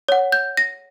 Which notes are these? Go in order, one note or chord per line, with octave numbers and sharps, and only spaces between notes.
C#5 F#5
G6
A#6